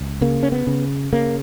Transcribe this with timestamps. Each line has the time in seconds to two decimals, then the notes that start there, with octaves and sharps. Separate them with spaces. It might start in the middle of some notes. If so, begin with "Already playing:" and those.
Already playing: C#2
0.21 C#3 A#3
0.43 C#4
0.52 B3
0.67 C#3
1.13 C#3 A#3